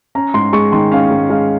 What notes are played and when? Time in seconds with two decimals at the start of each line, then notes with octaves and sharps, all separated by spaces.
0.15 C#4 A#5
0.34 G#2 C6
0.53 G#3 C#6
0.72 D#3 C6
0.92 C#4 F5
1.11 G#2
1.30 G#3 F5